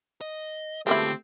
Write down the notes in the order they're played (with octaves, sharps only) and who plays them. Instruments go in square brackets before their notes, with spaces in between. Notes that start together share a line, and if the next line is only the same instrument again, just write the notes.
[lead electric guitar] D#5
[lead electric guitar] D3 F4 [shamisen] G#3 B3 E4 [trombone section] A3 G4 [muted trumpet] C4